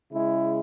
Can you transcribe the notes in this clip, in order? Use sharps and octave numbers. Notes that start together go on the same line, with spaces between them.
C#3 G#3 E4